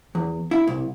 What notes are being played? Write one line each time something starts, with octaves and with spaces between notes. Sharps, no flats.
E2
E4
C2